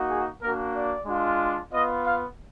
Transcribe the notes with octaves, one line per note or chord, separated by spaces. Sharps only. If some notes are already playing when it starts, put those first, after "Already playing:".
Already playing: A#3 D#4 F#4
G#4
A#3 D4 F#4 A#4
D5
G#3 D4 F4
B3 F4 D#5
F5